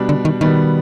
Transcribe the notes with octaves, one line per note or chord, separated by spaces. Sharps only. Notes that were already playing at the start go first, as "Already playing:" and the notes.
Already playing: B2 G3 D4
D3
D#3
B2 D#3 G3 B3